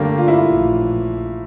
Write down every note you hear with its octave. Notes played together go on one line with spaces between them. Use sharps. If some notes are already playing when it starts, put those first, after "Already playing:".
Already playing: G2 D3 G3 A3 A#3
F4
E4
F4
A#1 A2 E3